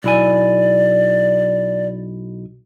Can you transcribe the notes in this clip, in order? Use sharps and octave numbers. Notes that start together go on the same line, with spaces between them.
B1 E4 D5 G#5